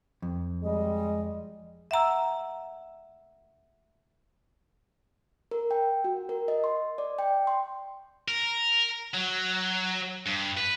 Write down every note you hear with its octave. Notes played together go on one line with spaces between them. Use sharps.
F2
G3 G#3 D#5
E5 F#5 A#5 E6
A#4
G5
F#4
A#4
D#5
C6
D5
G5
C6
A#4
F#3
G2
B4